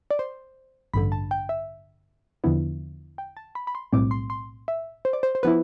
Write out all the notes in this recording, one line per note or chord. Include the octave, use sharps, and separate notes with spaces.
D5
C5
A1 G2 D3 B5
A5
G5
E5
E2 D3 F3 B3 E4
G5
A5
B5
B5
C6
B1 A2 G3 C4 D6
C6
C6
E5
C5
D5
C5
C5
F3 B3 E4 B4